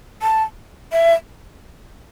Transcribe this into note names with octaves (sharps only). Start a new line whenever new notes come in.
A5
E5